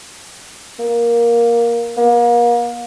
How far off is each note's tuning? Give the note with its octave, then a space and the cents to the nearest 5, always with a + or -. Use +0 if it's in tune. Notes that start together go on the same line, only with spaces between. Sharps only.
A#3 +10
A#3 +35